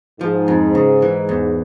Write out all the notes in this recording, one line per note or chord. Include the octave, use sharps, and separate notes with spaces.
G#2 F3
F2
C#3
E3
E2